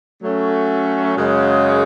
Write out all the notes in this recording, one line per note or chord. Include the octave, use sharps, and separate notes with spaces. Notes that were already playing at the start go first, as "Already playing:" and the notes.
F#3 A3 C#4
F#2 C#3 G#3